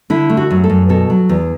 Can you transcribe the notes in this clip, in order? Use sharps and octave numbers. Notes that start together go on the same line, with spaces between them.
D3 E4
A3
F#4
F#2
A4
F#2
B2 A4
F#3
E2